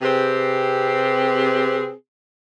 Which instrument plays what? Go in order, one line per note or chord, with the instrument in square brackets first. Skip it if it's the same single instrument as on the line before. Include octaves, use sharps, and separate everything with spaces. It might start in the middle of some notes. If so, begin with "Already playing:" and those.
[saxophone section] C3 C4 G4 G#4 B4